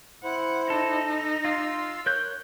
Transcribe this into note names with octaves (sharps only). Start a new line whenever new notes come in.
E4 C5 F#5
D#4 A4
F4 F5 C6 E6
A#4 C#5 F#6 G6